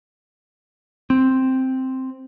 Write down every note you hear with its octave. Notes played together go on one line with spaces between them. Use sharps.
C4